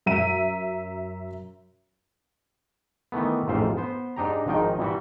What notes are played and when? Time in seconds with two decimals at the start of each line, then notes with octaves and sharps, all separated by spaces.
0.06 F#2 E5 A#5 D#7
3.12 D#3 E3 A3 B3
3.48 A1 F2 G#2 A3 C5 F5
3.77 B3 C5
4.16 G#2 D4 D#4 G4 A#5
4.48 G#1 G#2 D#3 F3 D#4 G5
4.80 E3 G3 F#4